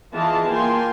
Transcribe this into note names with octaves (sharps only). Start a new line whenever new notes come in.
E3 F4 G#4 D#5 A5
A#3 F4 G5 G#5 C6